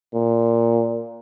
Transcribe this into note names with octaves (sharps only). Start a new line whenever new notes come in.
A#2